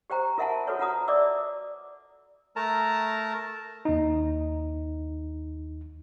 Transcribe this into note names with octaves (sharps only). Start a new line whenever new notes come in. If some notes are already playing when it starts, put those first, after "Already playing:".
G4 C5 G5 A#5
F4 A#4 E5 F#5 G#5 A5
F#4 A4 B4 C#5
F4 F#5 A#5 D#6
D5 E5 D6 E6
A3 A#4 A5 A#5
D#2 D#4